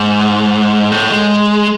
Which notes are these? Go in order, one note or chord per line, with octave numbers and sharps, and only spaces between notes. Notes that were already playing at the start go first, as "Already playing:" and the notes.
Already playing: G#2
A2
G#3